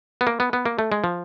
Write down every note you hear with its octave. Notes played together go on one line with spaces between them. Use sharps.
B3
A#3
B3
B3
A#3
A3
G#3
F3